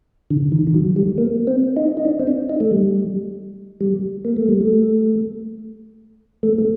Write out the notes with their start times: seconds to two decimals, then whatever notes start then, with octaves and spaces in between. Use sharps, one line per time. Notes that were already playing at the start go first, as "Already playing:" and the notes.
0.31 D3
0.52 D#3
0.67 D#3
0.74 F#3
0.96 G3
1.18 A#3
1.47 C4
1.77 D#4
1.97 D#4
2.05 D4
2.19 C4
2.27 D4
2.49 D#4
2.60 A3
2.71 G3
3.81 G3
4.25 A#3
4.36 A3
4.49 G3
4.61 A3
6.43 A3
6.58 A3